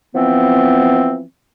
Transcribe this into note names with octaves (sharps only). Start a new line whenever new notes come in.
E3 F3 B3 C4